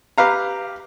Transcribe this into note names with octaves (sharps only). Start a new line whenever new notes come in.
G4 B4 F5 A#5